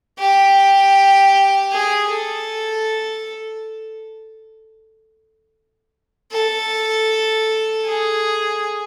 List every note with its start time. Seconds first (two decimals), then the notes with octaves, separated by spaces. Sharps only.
0.19 G4
1.72 G#4
2.11 A4
6.32 A4
7.85 G#4